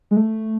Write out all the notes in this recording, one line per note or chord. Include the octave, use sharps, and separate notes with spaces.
G#3
A3